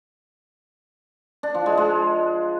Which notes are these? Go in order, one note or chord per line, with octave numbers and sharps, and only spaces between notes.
D4
F3
G#3
G#3